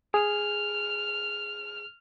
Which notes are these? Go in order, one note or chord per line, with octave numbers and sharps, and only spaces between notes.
G#4 F6